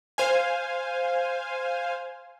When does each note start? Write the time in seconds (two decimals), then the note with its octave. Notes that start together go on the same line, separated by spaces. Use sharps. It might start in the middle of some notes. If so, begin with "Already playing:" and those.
0.18 C5 F5 G#5